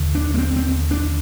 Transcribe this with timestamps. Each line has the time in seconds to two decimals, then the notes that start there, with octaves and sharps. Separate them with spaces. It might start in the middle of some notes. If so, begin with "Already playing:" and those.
Already playing: D#2 D3
0.15 D4
0.34 A#3
0.38 C4
0.56 C4
0.91 D4